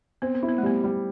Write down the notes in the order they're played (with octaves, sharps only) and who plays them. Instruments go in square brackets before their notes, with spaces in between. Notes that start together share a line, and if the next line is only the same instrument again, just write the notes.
[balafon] B3 [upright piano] C4
[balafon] B3
[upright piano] E4
[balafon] B3
A3
[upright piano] G3 [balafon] B3
[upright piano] G3